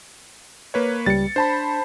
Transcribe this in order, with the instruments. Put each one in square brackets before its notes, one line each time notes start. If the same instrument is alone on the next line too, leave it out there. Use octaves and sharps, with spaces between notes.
[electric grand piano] A#3 B4 C#5
[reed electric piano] C#2 G3 [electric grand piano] A6 C#7
[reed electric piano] D4 [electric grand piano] C5 A5 B5